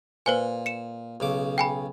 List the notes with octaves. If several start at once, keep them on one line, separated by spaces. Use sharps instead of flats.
A#2 B4 C5 G#5
C#7 E7
B1 C#3 D6
G5 G#5 B5